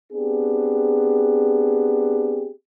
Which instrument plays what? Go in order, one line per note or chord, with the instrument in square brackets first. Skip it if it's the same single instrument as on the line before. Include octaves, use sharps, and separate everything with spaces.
[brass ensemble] B3 C4 D4 G4 G#4